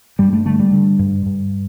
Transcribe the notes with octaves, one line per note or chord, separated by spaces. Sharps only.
G2 G3
A3
D3 A3
G3
D3
G2
G2